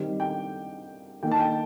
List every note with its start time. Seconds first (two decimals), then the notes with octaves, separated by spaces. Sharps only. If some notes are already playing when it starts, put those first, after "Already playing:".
Already playing: D#3 G3 C4
0.20 G5
1.23 D#3 A#3 G5
1.31 A5
1.40 G5